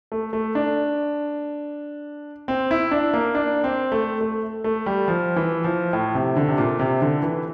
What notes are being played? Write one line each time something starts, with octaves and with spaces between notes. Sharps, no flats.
A3
A3
D4
C4
E4
D4
A#3
D4
C4
A3
A3
A3
G3
F3
E3
F3
A2
C3
D3
C3
A#2
C3
D3
E3